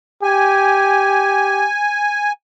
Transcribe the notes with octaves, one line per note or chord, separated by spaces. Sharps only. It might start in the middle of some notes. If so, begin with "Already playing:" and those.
G4 G#5